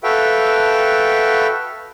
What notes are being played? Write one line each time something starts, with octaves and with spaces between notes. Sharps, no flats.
F#4 A4 B4 E5 F5 G5